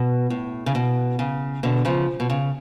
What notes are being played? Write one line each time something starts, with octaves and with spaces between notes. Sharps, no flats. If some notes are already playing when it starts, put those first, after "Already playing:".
Already playing: B2
A2
C#3
B2
C#3
B2 D3
C#3 F3
B2
C#3